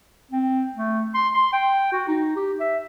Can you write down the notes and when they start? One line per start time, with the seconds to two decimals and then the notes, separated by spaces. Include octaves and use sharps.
0.31 C4
0.75 A3
1.15 C6
1.34 C6
1.53 G5
1.92 F#4
2.08 D#4
2.36 G4
2.60 E5